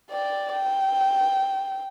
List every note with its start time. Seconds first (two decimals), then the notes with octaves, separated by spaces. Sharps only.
0.11 D5 G5
0.52 G5